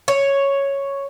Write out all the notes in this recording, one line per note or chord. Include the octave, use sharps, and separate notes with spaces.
C#5